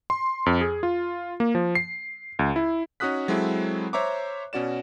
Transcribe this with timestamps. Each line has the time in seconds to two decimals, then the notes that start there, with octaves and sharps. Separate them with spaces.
0.10 C6
0.46 F2
0.61 G#4
0.83 F4
1.40 A#3
1.55 F3
1.75 C7
2.39 C#2
2.56 E4
3.00 C#4 D#4 F#4 D#6 F#6 B6
3.28 F#3 G#3 C4 E4 A4
3.93 C5 C#5 E5 A#5 C#6 D6
4.53 B2 C#4 F#4 D5 E7